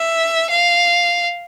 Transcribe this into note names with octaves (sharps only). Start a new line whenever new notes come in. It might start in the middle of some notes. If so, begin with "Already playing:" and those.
Already playing: E5
F5